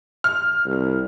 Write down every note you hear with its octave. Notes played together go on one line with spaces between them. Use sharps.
F6
C2